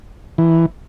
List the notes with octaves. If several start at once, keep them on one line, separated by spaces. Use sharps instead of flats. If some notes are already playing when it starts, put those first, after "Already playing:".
E3